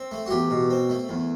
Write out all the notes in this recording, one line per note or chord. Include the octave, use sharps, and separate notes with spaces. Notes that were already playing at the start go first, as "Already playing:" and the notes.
Already playing: C4
A3
F#4
E2 G4
B2
C4
A3
E2